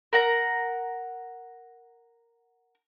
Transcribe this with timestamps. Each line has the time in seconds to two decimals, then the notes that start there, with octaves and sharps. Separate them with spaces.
0.13 A#4 F#5 A#5